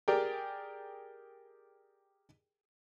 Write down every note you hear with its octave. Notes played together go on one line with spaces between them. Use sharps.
G4 G#4 A#4 D5 G5